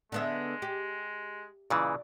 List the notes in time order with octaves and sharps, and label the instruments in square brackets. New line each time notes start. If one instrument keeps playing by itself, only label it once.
[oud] D3 B3 E5 [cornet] G#3
[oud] G4
[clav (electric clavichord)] A#2 C#3 E3 [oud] D5